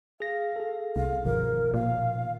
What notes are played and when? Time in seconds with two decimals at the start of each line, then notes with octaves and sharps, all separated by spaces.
0.20 G#4 F5 A#6
0.56 G#4 A4
0.96 C2 F5
1.25 G1 B2 D#3 F3 A#4
1.74 A#2 F5